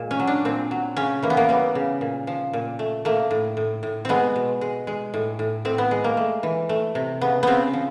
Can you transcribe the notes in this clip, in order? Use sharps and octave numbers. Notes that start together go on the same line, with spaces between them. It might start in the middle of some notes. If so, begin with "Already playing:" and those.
Already playing: A#2 G#3
C#4
F#3
D4
A#2 C4
F#3
C#3 C#4
E3 A#3
B3
A#3
G3 B3
C#3
A#2
F3
A#2
A3
A3 A#3
A2
A2
A2
G#3 B3 C4
B2
G#3
G#3
A2
A2
A2 C4
B3
G#3
A#3
A3
E3
A3
C3
C#3 B3
C#3 B3 C4
F3